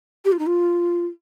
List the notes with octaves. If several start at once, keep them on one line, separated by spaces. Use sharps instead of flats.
G4
F4
D#4
F4